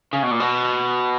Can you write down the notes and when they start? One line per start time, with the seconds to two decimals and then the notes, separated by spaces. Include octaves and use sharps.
0.13 C#3
0.23 B2
0.31 A#2
0.40 B2